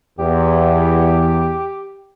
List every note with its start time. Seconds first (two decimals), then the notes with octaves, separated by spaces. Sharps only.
0.19 E2 G4